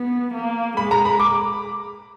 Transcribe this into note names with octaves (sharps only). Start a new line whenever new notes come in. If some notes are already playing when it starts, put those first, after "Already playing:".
Already playing: B3
A#3
G#3 B5
A#5
B5
D6